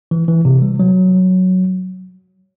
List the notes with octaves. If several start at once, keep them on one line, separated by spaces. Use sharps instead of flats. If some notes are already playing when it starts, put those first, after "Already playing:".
E3
E3
C3
G3
F#3